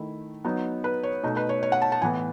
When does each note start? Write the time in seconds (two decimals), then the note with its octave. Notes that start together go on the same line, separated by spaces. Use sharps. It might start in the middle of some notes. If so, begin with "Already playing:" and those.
Already playing: D#3 A3 E4
0.45 F#3 B3 D#4
0.84 B4
1.03 C#5
1.23 B2 A3 D#4
1.37 B4
1.49 C#5
1.63 C#5
1.72 F#5
1.82 A5
1.92 A5
2.02 A2 E3 B3 G#5